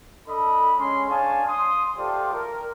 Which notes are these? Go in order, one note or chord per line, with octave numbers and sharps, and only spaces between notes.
D4 A4 D#5 B5
G#3 C#4 C6
D4 G#4 C#5 F5 G#5 A5
C6 D#6
A3 F4 G4 A4 C5 D5
A#4